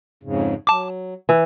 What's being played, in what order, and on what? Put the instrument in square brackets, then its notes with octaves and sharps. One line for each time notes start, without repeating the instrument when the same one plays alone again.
[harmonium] F2 G#2 C#3
[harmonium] F#3 [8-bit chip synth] A5 D6
[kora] E3